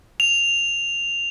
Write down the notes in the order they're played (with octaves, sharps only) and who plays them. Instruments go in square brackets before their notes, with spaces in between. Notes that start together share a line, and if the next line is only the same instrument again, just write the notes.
[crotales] F7